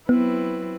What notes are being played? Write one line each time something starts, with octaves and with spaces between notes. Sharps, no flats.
F#3 B3 C4 E4 B4